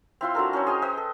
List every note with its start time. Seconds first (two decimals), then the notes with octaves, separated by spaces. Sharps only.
0.21 C4 E4 F4 C6
0.35 F#3 D4 A4 A#4
0.53 C#4 A#4 C5 C#5
0.67 G#4 D#5 G5
0.82 B4 C5 D#5 G5
0.97 A4